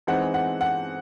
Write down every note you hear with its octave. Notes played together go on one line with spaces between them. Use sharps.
E3 G#3 C4 D#4 F#5
F#5
F#5